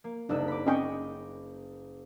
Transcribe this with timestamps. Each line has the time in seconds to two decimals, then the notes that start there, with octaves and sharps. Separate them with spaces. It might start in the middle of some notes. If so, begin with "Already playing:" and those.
0.04 A#3
0.29 F#1 C2 D4 D#4 E6 F#6
0.48 B5 D6
0.67 C4 C#4 D#5 G5 C#6